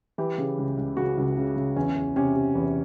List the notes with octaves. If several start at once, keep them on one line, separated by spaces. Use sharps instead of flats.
E3 G4
C#3
C#2
C#2
C#3 F#4
C#2
C#3
C#3
E2 C#4
E2
C3 C#4
C3
E2